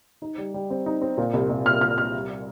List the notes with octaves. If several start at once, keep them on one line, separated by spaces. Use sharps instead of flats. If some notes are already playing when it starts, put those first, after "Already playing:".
D#4
G3
G3
C4
D#4
C4
A#2
C2
C2
A#2 F6
A#2 F6
C2 F6
G3